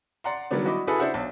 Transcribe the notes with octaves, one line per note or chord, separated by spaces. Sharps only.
D5 F#5 A#5 C6
D#3 F#3 G3 B3 D4
E4 F#4 D#5 B5 D6
E4 F#4 G#4 A4 B4
D4 E4 C5 E5 F#5
B1